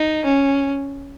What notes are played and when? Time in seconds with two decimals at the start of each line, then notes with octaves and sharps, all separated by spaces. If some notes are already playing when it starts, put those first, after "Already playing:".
Already playing: D#4
0.25 C#4